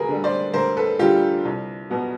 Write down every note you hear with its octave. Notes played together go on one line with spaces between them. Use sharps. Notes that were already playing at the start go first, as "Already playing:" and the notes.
Already playing: D2 F#4 G#4 A#4 B4
D3 G3
C5 D5
D2 A#4 C5
A4 B4
D3 G3 F4 G4
C2
B2 F#3 B3